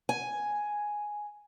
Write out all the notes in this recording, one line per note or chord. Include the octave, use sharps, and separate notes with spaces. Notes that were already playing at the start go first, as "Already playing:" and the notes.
G#5